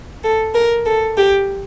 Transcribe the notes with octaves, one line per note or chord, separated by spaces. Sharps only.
A4
A#4
A4
G4